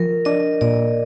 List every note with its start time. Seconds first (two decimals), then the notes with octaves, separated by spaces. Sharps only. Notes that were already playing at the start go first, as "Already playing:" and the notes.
Already playing: F3 A#4
0.25 D4 D#5
0.61 A#2 D5